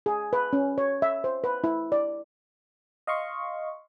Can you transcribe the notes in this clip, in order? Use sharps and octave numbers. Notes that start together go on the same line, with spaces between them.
G#4
B4
C#4
C#5
E5
C5
B4
E4
D5
D#5 F5 C6 C#6